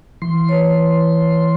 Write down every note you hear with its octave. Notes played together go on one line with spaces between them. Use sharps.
E3 C6
B4 C#5